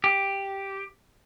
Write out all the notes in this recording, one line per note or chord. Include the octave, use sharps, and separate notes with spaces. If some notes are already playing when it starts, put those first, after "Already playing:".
G4